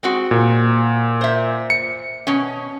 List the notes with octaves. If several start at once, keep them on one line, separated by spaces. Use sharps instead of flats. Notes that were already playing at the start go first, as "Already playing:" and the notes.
G#3 C4 F#4
A#2
C5 E5
C#7
B2 C#4